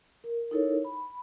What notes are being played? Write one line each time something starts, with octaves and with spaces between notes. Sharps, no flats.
A#4
D#4 E4 A4 A#4 C#5
B5